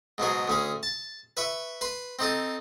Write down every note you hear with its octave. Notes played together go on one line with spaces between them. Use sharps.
G#2 B2 F#3 G#4
D2 C#4 G#4
A5
B4 E5 C#6
B4 C6
C4 D#4 A4 D#6